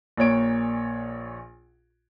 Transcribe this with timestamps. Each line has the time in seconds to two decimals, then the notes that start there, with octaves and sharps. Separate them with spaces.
0.17 A#1 A#2 C#5 D7